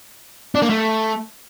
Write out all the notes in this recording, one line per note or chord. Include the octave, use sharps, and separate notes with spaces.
D4
A#3
A3